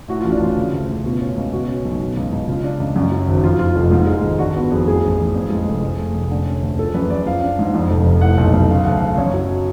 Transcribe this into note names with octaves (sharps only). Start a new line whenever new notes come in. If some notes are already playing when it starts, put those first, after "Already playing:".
A2 F#4
A1 F4
D4
A1 F4
C#3
D2
D2
B2 F4
C#4
C#2
B2 F#4
C#4
B1
B2
C#2
C#2
C#3 F4
D4
C#2
F#2
F#3
G#1
F2 F4
F3 F4
F1 F4
G#2 F4
G#3
G#1
D3 F#4
B3 F#4
F2 G#4
A2 G#4
A1
A1
F2
G#3
F1
F2
A3
F1
D3
C#4
D2
F3 A4
F#2 B4
F#2 D5
F3 F5
D4
G#2
F2
F1
F1
A2 F#5
B1
B1
C#3 F5
D2 F#5
D2 F5
F#2 C#5
F#3